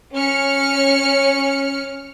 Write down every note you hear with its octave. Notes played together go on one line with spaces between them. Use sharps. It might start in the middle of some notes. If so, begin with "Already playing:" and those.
C#4 F6 C#7